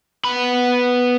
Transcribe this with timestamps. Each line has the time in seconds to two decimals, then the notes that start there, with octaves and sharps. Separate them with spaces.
0.24 B3 B5